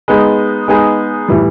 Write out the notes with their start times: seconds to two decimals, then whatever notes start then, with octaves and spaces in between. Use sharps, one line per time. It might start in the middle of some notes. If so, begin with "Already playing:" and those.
0.08 G#3 B3 D#4 G#4
0.68 G#3 B3 D#4 G#4
1.28 A2 E3 G3